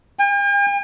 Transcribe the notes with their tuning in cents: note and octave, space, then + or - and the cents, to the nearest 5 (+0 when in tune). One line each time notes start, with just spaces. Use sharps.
G5 +45